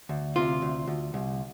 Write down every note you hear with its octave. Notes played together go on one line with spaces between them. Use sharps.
D2
C3 F4
D2
D2
C2